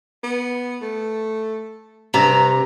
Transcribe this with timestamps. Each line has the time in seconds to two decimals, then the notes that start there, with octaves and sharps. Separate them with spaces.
0.23 B3
0.81 A3
2.14 G2 C3 A#5